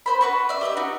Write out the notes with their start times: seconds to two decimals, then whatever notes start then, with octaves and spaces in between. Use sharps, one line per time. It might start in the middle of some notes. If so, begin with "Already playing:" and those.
0.06 B4 C5 B5
0.21 F#4 B4 C#6
0.49 D5 E5
0.61 G4 B4 D#5 E5
0.77 D#4 F#4